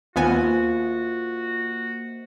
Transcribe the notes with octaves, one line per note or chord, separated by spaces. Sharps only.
D#2 A#3 B3 F4 F#4 C5 D#5 G#5